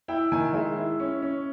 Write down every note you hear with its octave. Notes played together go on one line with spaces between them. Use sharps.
E4 G5
D#3 G#5
G#3 E5
E4
C#4
C#4